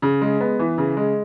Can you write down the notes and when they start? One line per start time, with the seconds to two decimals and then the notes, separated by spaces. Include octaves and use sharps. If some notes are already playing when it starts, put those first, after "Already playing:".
0.02 C#3
0.22 G#3
0.41 B3
0.59 E3
0.78 C#3
0.97 G#3